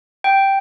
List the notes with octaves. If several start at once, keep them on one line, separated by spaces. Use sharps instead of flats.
G5